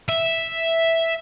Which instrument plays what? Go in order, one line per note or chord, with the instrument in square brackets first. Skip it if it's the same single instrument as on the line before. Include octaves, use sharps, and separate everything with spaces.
[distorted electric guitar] E5